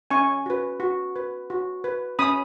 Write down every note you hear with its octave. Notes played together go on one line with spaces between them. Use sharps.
C#4 G#5 C#6
F#4 B4
F#4
B4
F#4
B4
C#4 B5 D#6